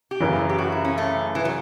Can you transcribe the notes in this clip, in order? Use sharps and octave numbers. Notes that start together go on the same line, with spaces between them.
G4
F#2 C#3 E3
G4
F#4
E4
C#4
A3
E3
F#3